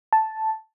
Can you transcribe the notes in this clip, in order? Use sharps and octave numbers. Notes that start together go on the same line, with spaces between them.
A5